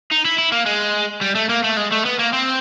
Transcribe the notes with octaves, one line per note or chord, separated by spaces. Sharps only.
D#4
E4
E4
A#3
G#3
G3
A3
A#3
A3
G#3
A3
B3
A#3
C4